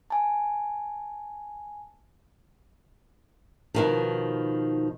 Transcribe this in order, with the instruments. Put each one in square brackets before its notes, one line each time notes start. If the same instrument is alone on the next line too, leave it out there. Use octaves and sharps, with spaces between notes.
[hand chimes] G#5 A5
[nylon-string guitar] B2 D#3 F3